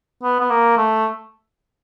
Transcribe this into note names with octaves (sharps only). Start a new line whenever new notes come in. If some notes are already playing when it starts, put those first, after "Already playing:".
B3
B3
A#3
A3